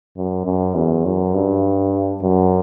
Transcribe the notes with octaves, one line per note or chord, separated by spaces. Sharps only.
F#2
F#2
E2
F#2
G2
F#2